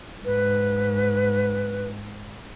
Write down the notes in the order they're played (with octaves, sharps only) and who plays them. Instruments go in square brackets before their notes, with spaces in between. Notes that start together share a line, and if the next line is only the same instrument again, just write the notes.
[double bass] G#2 [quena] B4